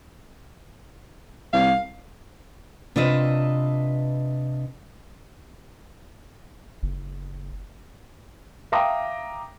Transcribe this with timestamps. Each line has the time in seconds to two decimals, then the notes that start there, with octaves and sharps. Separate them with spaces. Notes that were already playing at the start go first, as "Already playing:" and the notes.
1.53 C2 F5
2.96 C3 D4 F4 B4 D#5 E5
6.83 F#1
8.72 E5 F5 G5 A#5 D6 D#6